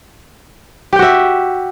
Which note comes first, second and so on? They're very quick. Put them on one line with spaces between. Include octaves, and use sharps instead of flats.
G4 G5 F#4 E5